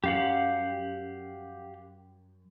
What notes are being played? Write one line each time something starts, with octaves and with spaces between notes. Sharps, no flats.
F#2 G4 F5 F#5